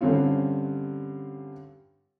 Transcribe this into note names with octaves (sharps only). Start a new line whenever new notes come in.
G2 D3 C4 C#4 F4